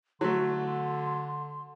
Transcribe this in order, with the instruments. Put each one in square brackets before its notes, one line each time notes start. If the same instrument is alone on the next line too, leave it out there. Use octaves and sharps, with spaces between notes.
[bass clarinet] D3 [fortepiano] F#3 A3 [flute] C6